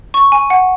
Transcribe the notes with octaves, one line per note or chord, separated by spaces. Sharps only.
C#6
G#5
F#5